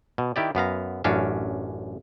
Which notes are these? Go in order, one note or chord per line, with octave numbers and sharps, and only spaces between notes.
B2
D#3 E4 G4 D5
F#2 B3 F5 A#5
A1 F#2 C#4 D4 F5